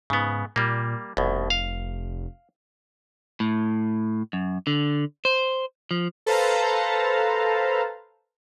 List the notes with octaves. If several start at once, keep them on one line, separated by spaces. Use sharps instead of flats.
G#2 C#3 B3
A#2 G3 A#3
F1 C2 B2
F5
A2
F#2
D3
C5
F3
A4 B4 C5 F5 A5 A#5